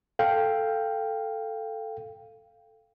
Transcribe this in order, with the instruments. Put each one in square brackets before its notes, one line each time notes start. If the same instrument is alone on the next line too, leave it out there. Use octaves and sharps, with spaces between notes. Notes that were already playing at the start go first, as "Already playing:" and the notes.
[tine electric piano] A4 F5 G5